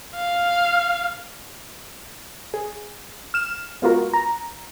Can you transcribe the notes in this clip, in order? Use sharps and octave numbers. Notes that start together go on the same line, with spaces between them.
F5
G#4
F6 E7
G#3 A#3 B3 F4 F#4 A#4
A#5